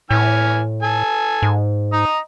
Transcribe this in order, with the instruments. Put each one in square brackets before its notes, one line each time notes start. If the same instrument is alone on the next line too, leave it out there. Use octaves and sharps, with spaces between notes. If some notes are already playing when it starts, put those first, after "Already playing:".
[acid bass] A2 [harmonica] E3 G#5 F6
[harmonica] A4 G#5
[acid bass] G#2
[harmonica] D#5 A#5